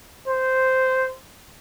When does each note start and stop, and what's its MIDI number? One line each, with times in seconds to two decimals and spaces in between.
0.28 1.13 72